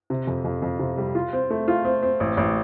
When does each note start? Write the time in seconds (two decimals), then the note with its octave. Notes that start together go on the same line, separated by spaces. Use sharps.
0.10 C3
0.27 F2
0.45 F2
0.62 F2
0.79 C3
0.98 G3
1.15 F4
1.33 C4
1.50 A3
1.68 F4
1.85 C4
2.03 C4
2.20 A1
2.37 A1